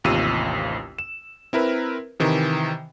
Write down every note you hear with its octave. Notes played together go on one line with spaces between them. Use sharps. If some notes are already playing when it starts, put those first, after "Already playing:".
A1 D#2 C3 F4 E6 D#7
E7
C4 E4 A#4 B4
C3 D#3 E3